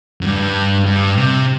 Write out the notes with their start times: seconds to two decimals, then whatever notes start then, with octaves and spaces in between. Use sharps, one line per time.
0.21 F#2
0.27 G2
0.86 G2
1.17 C3